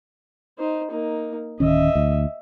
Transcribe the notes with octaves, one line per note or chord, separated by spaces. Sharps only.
D#4 C5
A#3 D#4
D1 D#3 C#4 D#5 E5
D2